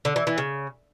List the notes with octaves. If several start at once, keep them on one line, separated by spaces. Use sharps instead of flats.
D3
E3
E3
C#3